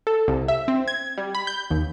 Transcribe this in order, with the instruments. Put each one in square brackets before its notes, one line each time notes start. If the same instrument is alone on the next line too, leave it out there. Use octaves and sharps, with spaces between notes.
[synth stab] A4
C2
E5
C4
G#6
G3
B5
G6
D#2